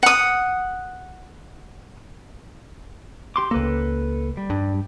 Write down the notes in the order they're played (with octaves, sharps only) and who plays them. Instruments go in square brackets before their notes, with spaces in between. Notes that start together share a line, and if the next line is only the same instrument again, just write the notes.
[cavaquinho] F#5 D#6
[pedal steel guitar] G4 C6 D6
[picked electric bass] C#2 A#3 [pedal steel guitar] A4 B4
[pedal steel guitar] G3
[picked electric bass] G2